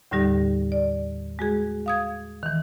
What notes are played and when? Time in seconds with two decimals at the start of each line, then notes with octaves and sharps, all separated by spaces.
0.11 D#2 A2 D3 G3 D#4 G4
0.72 D5
1.39 G#3 F#4 G#4
1.86 F5 D#6 G#6
2.43 D#3 E3